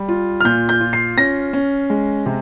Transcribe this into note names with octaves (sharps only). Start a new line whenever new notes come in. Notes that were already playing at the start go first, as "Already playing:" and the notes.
Already playing: G3
F4
F6
A#2 G6
G6
F4
C7
C#4 A#6
C#4
G#3
C3